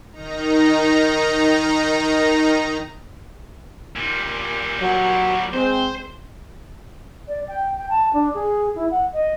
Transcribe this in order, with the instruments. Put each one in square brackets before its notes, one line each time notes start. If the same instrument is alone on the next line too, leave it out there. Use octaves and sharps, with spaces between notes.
[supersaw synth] D#3 D#4 A#5
[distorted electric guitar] A#2 G3
[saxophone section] F#3
[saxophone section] G#3 C4 [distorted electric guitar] C5
[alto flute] D5
G5
G5
A5
D4
G#4
E4
F#5
D#5